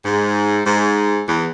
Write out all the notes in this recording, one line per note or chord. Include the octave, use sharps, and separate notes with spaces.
G#2
G#2
E2